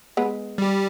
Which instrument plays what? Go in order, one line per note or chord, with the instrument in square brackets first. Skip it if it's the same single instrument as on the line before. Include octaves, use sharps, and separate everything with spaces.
[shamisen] G#3 B3
[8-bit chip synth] G3 G4